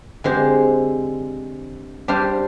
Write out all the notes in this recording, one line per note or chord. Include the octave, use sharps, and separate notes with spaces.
D3 G#3 C4 G4 C5
G3 D4 G4 C5 F5